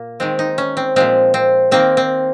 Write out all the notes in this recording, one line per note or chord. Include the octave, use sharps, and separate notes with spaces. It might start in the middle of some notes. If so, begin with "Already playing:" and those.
Already playing: A#2 A#3
D#3 G#3 C4
D#4
C#4
C4
A#2 F3 G#3 C4
C4
D#3 A#3 C4
C4